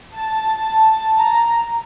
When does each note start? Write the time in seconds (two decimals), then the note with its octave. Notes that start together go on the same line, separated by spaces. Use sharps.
0.14 A5
1.18 A#5